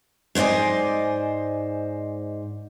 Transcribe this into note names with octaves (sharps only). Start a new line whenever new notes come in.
G#2 C5 D5 D#5 G#5